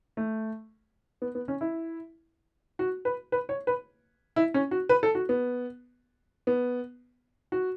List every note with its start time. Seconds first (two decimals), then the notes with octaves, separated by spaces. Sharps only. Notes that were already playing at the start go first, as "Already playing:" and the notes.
0.17 A3
1.22 B3
1.35 B3
1.48 C#4
1.61 E4
2.79 F#4
3.05 B4
3.32 B4
3.49 C#5
3.67 B4
4.36 E4
4.54 C#4
4.71 F#4
4.89 B4
5.03 A4
5.15 F#4
5.29 B3
6.47 B3
7.52 F#4